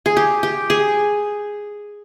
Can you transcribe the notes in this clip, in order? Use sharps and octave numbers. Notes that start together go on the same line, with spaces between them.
G#4
G4
G4
G#4